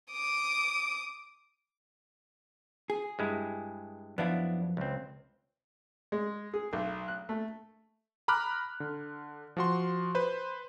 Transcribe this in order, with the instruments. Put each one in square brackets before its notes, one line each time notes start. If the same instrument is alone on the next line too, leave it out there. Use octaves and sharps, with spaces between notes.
[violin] D6 D#6
[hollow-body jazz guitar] G#4
[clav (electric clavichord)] G2 G#3 E4
[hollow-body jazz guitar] F#2 F3 F5 [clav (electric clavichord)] B3 D4 E4
[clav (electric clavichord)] C#2 C4
[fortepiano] G#3
G#4
B1
F#6
A3
[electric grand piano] A#5 B5 D6 F6 F#6
D3
F3 F#4 C6
B4 C5